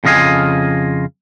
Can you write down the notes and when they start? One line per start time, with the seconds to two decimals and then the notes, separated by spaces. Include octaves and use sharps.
0.04 F2 C#3 F4 D#5 F5 G#5